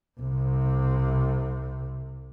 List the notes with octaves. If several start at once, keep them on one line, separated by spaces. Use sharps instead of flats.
C2 C3